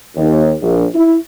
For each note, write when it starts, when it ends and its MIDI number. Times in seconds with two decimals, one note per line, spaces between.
0.17 0.53 39
0.62 0.84 34
0.94 1.16 64